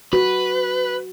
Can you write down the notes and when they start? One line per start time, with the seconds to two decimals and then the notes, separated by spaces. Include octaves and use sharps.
0.13 F#4 B4